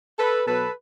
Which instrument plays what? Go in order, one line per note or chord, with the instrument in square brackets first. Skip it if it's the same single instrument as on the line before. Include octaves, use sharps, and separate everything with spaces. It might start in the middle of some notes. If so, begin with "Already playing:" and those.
[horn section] A4 B4
B2 F#3 A4 B4